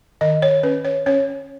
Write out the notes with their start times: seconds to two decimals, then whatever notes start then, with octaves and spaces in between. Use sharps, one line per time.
0.21 D#3 D#5
0.42 C#5
0.63 C#4 B4
0.85 C#5
1.06 C#4 C#5